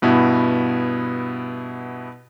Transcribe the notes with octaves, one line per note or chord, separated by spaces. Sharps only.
G2 B2 B3 E4